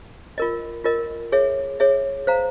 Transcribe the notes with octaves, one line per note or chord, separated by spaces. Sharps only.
F4 A#4 D#5
F4 A#4 D#5
G#4 C#5 E5
G#4 C#5 E5
C5 F5 A#5